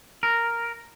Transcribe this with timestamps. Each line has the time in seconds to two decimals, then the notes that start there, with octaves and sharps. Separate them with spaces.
0.23 A#4